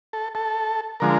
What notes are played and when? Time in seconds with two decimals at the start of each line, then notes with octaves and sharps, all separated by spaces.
0.13 A4
0.35 A4
1.00 D3 F3 G#3 A#4